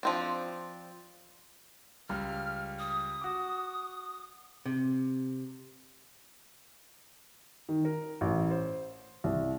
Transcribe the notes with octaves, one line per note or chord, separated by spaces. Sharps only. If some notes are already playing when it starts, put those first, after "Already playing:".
F3 C4 D4
C#2 G3 F6
D#6
F#4 D6
C3
D#3
A#4
A1
C5
C2